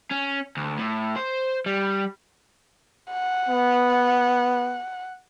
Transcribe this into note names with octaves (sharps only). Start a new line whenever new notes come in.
C#4
D2
A2
C5
G3
F#5
B3